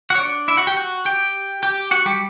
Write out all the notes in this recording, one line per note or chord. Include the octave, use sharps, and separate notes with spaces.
F#4 F#5
C#5
D4 D5
E4 E5
F#4 F#5
G4 G5
F#4 F#5
G4 G5
G4 G5
F#4 F#5
G3 G4